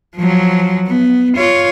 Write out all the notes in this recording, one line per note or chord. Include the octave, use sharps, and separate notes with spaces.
F3 F#3
B3
F4 C#5